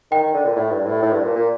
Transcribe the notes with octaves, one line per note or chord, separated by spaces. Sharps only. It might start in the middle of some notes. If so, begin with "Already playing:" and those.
D#3 G5
D#3
D3
A#2
A2
G2
A2
A2
G2
A#2
A#2